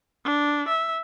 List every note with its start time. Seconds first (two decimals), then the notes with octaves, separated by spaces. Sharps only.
0.25 D4
0.68 E5